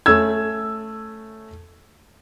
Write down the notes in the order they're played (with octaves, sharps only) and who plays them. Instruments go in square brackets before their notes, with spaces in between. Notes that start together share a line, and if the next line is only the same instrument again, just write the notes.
[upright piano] A3 C#4 E6 G#6